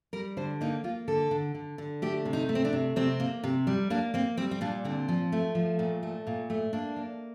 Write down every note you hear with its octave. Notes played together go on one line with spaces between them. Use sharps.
G3 A#4
D3 C5
A#3 D#4
A#3 F4
D3 A4
D3
D3
D3
A3 G4
C3
D#4
A3
C4
D4
C3
C3 C4
A#3
C3
G3
A#3 D4
A#3 C4
G3 C4
C4
A#2 D4
D3 C4
F3
A3
F3
A#2
A3
A#2
A3
A#3 D4
A#3